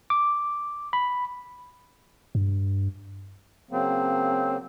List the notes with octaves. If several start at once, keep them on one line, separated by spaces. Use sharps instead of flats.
D6
B5
G2
C#3 F#3 A#3 C4